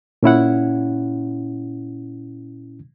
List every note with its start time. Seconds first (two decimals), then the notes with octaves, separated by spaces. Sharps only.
0.23 A#2 C#4 E4 F#5